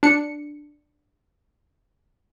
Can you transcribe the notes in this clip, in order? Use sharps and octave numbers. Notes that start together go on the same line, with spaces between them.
D4 C#7